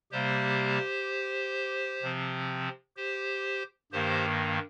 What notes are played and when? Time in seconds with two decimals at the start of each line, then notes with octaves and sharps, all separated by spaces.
0.12 C3 G3 A#3 G4 C5
2.02 C3 F3 C4
2.97 G4 C5
3.92 G2 D#3 A#3 G4 C5